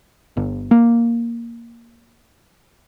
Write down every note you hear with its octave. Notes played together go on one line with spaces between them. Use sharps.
G1
A#3